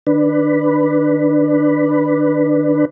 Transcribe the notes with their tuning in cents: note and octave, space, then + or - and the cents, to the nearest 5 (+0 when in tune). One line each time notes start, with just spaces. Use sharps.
D#3 -30 D4 +10 B4 +0